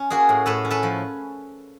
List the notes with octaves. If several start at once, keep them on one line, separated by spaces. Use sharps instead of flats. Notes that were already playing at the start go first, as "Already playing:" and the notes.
Already playing: C#4
A#3 F#4 G#4
A2
A2 A4 B4
C#4
A4 B4
F3